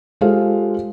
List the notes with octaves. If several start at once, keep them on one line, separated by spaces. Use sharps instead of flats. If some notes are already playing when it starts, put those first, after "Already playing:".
G#3 F4 G4 A4 C5 F5